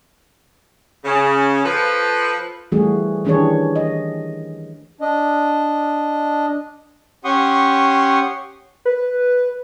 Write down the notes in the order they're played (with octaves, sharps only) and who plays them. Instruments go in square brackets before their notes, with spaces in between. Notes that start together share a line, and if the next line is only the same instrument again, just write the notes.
[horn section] C#3
F3 A4 B4
[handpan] E3 F3 G3 A3 F#4 G#4
D#3 E3 D4 G4 G#4 C#5
D#5
[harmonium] D4 D#5
[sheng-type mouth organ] C#4 G4 F#5 C6 C#6 D#6
[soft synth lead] B4